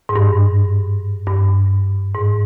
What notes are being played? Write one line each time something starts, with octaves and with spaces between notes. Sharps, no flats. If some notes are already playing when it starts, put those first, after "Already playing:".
G#2
G2
G2
G#2